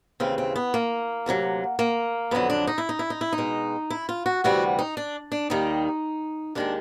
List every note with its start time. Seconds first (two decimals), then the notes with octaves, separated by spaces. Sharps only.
0.20 D#2 C#3 E3 C4
0.38 C4
0.56 B3
0.74 A#3
1.26 D2 C3 D#3 F#3
1.79 A#3
2.31 F2 D3 F#3 B3
2.50 D4
2.67 D#4
2.78 E4
2.89 D#4
2.99 E4
3.10 D#4
3.21 E4
3.33 D#4
3.38 B2 G#3
3.90 E4
4.09 F4
4.26 F#4
4.44 D2 C3 E3 G3 F#4
4.79 D#4
4.97 D4
5.32 D4
5.50 D#2 D#3 G3 D#4
6.55 D#2 D#3 G#3 D4